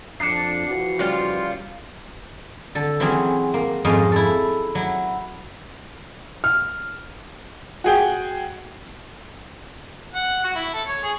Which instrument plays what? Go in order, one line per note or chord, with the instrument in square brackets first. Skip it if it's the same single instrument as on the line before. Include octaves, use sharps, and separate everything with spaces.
[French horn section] F2 [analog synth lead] D4 [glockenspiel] C7 C#7
[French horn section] E3 F3 F#4
[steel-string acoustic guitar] C#3 G3 [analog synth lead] F4
[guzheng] D3 A4
E3 F#3 C4 C#4 G#4
A#3
F2 G#2 C#4 G#4 D#5 F5
E4 A4
F#3 E4
[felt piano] F6
[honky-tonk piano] F#4 G#4 G5
[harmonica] F#5
F#4
E4
A4
C#5
G#4